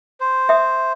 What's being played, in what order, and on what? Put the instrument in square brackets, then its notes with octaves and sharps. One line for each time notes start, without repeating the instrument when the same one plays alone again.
[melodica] C5
[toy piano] E5 D#6